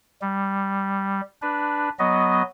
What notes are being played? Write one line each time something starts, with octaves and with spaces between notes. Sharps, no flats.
G3
D4 B4
F#3 B3 D#5